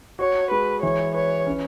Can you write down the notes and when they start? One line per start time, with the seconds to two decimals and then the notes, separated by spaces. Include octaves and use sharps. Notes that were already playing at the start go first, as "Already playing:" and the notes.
0.19 F#4 C#5
0.51 G#3 B4
0.82 E3 C#5
1.14 B4 C#5
1.47 C#4